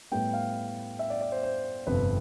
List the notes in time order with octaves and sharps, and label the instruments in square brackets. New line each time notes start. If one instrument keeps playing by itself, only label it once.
[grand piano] A2 G3 B3 G5
F5
E5
D5
D5
C5
C5
G1 F2 C3 B4